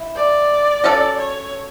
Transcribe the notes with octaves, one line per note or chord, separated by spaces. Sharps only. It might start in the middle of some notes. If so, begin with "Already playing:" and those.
Already playing: E4
D5
F#3 C#4 F#4 A4
C#5